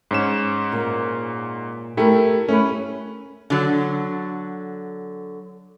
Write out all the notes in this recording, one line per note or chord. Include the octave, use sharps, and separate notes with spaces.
G#2 C#4 E7
A#2
A3 E4 G4 A#4
A3 C#4 B4
D3 F#3